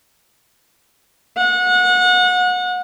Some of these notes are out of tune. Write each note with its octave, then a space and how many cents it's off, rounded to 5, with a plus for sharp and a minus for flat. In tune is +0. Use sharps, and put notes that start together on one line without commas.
F#5 -30